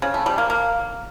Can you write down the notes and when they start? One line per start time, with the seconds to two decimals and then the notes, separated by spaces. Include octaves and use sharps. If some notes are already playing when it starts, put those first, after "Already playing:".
0.02 C#3
0.14 A3
0.26 G3
0.38 A#3
0.50 A#3